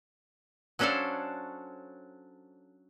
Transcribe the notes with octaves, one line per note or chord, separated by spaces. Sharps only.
F#3 C#4 D4 A4 C5 F5